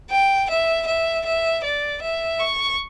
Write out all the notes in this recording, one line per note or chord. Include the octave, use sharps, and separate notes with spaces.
G5
E5
E5
E5
D5
E5
C#6